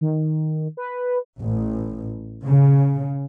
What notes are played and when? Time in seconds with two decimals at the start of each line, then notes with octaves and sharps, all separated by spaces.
0.01 D#3
0.77 B4
1.39 A1
2.45 C#3